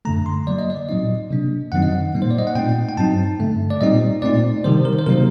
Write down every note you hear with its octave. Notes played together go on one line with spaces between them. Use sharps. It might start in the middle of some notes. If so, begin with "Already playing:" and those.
F#2 D3 A3 A#5
C6
D3 F#3 A#3 D5
D#5
D5
A#2 F#3 C4 D#4 D#5
C3 F#3 A#3 D4
F#2 D#3 F#3 C4 D#4 F#5
D#5
F#5
A#2 G3 A#3 D#4
C5
D5
D#5
F#5
A#2 A3 C4 D#4 G5
G5
G2 F#3 C4 D#4 A5
G2 D3 A3
D5
A#2 G3 C4 D#4 D#5
A#2 A3 C4 D#4 D5
C3 D#3 G3 C5
A#4
C5
C3 F#3 A#3 D#4 A#4